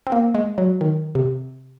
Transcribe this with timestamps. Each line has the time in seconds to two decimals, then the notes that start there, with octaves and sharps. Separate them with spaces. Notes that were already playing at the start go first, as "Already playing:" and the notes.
0.07 C4
0.12 A#3
0.35 G#3
0.58 F#3
0.81 D#3
1.15 C3